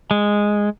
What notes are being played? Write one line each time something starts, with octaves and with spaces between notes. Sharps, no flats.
G#3